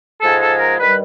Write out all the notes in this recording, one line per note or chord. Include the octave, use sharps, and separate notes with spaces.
G#2 F3 G#3 A4
A4
A#4
G2 D#3 G3 B4